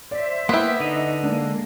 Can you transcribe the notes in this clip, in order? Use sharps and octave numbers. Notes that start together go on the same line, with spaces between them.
C5 D5 E5
A#3 B3 E4 G5 C6
D3 D#4 D#5
G#3 A#3 D4